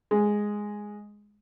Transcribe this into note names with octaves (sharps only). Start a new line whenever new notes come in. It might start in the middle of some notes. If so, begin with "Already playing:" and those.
G#3